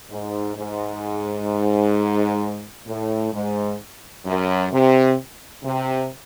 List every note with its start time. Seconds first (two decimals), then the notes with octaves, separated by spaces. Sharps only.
0.10 G#2
0.56 G#2
2.87 A2
3.33 G#2
4.26 F#2
4.72 C3
5.64 C3